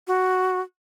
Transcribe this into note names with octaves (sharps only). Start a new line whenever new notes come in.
F#4